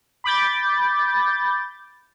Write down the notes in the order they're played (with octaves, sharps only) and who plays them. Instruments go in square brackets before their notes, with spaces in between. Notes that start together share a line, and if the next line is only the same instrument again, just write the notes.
[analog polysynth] B5 D6 G6 A6